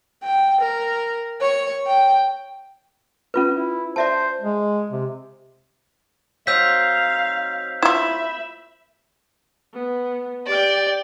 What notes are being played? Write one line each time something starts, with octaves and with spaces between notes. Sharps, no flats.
G5
A#4
C#5
G5
C#4 F4 B4
E4
C5 D5 E5 A5
G#3
C3
F#3 C4 D#4 F5 E6 G6 B6
E4 F4 E5 B5 E7
B3
G4 D5 G5